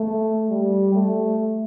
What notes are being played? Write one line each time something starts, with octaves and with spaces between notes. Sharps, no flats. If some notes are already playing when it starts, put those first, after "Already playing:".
Already playing: A3
G3
A3